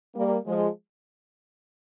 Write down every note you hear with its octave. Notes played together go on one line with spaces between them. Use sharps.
G3 A#3
F3 G#3